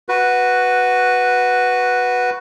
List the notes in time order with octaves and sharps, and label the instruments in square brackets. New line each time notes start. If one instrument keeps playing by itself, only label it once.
[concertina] F#4 B4